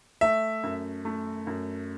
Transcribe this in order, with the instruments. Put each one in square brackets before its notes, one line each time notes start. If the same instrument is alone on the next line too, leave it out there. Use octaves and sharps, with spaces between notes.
[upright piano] A3 [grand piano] E5
[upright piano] F#2
A3
F#2